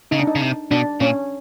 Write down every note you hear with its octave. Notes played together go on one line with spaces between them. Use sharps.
C#3 D#4
D4
D#4
C#3
C3
B2 D4
A#2 C#4